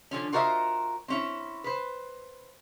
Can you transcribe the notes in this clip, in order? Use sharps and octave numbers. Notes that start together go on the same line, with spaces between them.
D3 F3 C#4
F4 F#4 A#4 C5 D#5 E5
C4 C#4 E4
B4 C5